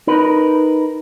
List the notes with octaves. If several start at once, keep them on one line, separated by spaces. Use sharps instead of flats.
D#4 A#4 B4